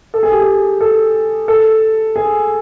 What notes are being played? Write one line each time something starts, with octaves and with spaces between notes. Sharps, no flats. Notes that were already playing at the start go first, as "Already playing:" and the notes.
A4
G#4
G4
G#4
A4
A4
G#4